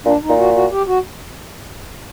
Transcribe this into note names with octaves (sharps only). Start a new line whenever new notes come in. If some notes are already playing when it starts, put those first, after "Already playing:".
A#2 D4
D#4
A#2
F#4
F#4
G4
F#4